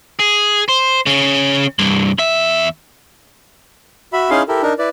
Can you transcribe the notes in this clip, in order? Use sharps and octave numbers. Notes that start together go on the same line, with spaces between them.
G#4
C5
C#3 C#4
C2 G2
E2 E5
F#4 E5 B5
C#4 D#4 E4 G#4 F5 C6
E4 G4 A4 A#4
D4 D#4 A#4
E4 B4 D5